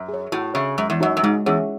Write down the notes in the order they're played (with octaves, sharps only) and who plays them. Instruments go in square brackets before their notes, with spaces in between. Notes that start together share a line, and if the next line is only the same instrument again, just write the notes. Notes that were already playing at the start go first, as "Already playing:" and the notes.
Already playing: [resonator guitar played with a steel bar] F#2
[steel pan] G#4
C#5
[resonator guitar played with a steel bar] A2 [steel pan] F#4
[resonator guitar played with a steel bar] C#3 [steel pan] C#5 E5
[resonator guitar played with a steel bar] F#2 [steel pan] G#3
[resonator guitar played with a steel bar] E2
[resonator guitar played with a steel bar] F#2 [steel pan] D#4 F#4 C#5
[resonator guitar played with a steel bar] F#2
[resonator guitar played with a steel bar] G#2 [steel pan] G#3
[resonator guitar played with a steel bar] E2 [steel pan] C#4 G#4 C#5 F#5